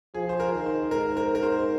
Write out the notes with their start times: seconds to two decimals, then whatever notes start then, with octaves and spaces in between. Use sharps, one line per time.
0.14 F3 G#4
0.29 C5
0.40 A#4
0.53 D#3
0.66 C5
0.91 G#2 A#4
1.17 A#4
1.35 A#4
1.43 C5